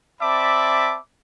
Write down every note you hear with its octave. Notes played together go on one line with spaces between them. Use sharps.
C4 D5 E5 A5 B5 D6